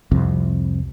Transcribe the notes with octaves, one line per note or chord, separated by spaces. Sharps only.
C2 F2 C3